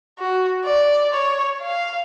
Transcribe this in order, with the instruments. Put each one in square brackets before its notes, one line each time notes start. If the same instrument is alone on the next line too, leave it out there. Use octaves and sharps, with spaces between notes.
[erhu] F#4
D5
C#5
F5